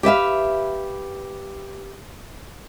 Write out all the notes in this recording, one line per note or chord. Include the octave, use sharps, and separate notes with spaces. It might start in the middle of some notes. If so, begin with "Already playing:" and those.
G4 B4 E5 F5